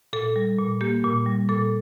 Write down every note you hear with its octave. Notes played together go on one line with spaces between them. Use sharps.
A#2 A4
G3
A#2
A#3 G4
A#2
G3
A#2 A4